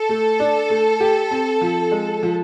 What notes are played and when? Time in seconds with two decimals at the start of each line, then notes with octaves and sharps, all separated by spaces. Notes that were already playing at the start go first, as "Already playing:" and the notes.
Already playing: A4
0.09 A3
0.40 D4
0.70 A3
1.00 G4
1.31 C4
1.61 F3
1.91 G#3
2.23 F3